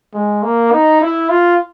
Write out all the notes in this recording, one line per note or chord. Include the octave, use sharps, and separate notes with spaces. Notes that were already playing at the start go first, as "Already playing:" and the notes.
G#3
A#3
D#4
E4
F4